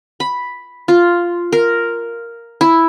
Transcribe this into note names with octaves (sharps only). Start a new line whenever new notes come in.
B5
F4
A#4
E4